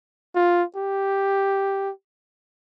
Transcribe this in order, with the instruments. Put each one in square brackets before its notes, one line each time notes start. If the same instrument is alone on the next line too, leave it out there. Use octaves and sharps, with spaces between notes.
[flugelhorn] F4
G4